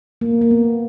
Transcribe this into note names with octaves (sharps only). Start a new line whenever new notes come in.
A#3
A#3
B3